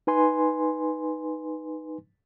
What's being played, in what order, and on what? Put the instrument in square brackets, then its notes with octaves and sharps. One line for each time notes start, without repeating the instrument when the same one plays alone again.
[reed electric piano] D#4 B4 G#5 C6